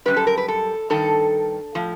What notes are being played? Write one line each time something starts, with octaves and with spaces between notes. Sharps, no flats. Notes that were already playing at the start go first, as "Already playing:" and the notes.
F#2 D#3 G3 B4
A4
A#4
B4
A4
G2 D#3 A4
A2 F3